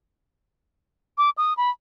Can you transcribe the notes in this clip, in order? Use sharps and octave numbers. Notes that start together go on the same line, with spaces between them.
D6
D#6
B5